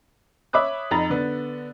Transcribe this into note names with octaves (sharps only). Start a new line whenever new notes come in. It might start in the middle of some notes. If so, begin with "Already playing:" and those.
C#5 E5 B5 D6 D#6 F#6
F2 D#4 A#5 B5 A6
D3 B3